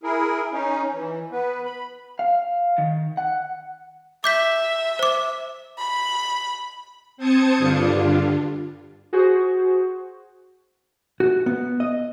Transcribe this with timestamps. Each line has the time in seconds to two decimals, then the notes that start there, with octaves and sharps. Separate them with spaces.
0.03 E4 G#4 A#4
0.53 C#4 D#4
0.93 E3
1.32 B3 B4
1.65 B5
2.19 F5
2.78 D#3
3.17 F#5
4.24 E5 D6 G6 B6
4.99 C5 D6
5.78 B5
7.17 C4 C5 A5 D#6 G#6 C#7
7.58 G2 D3 G3 D4 F4
9.13 F#4 G#4 C5
11.20 F#4
11.46 B3
11.80 D#5